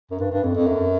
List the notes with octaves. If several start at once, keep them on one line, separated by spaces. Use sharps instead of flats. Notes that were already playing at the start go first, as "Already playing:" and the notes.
F#2
G2
G2
F2
F2
F#2